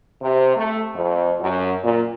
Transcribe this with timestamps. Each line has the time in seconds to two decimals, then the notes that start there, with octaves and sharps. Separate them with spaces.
0.23 C3
0.57 A3
0.95 F2
1.41 F#2
1.83 A#2